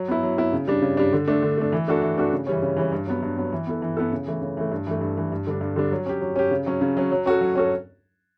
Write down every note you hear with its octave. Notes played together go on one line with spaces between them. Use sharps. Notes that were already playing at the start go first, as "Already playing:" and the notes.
Already playing: F#3
B3 E4
F#3
B3 E4
C#3
G3 D4
C#3
G3 D4
D3
A3 D4
D3
A3 D4
E3
A3 D4 F#4 A4
E3
A3 D4 F#4 A4
C#3
E3 G3 C#4
C#3
E3 G3 C#4
G2
F#3 B3
G2
F#3 B3
E3
B3 E4 A4
E3
B3 E4 A4
C#3
E3 A3
C#3
E3 A3
G2
E3 A3
G2
E3 A3
G2
D3 G3 D4
G2
D3 G3 D4
F#3
C#4 G4
F#3
C#4 G4
C#3
F#3 C#4
C#3
F#3 C#4
F#3
C#4 F#4 A4
F#3
C#4 F#4 A4